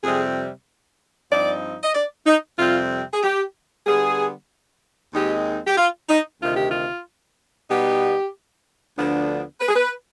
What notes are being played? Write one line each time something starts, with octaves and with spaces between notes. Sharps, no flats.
F2 C3 G3 C4 G#4
G2 F3 C4 D#4 D5
D#5
D5
D#4
F2 C3 G3 C4 F4
G#4
G4
D3 G3 B3 G#4
D#2 D#3 G#3 C4 D#4 G4
G4
F4
D#4
D2 C3 D#3 F4
G4
F4
B2 G3 B3 D#4 G4
D2 D3 F3 B3 D4
B4
G#4
B4